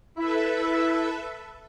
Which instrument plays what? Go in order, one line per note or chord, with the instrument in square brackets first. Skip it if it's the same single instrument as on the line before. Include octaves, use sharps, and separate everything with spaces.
[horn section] E4 [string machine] A4 B4 E5